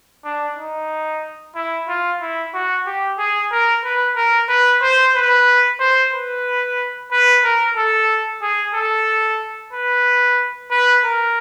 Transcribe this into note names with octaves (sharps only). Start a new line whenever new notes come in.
D4
D#4
E4
F4
E4
F#4
G4
G#4
A#4
B4
A#4
B4
C5
B4
C5
B4
B4
A#4
A4
G#4
A4
B4
B4
A#4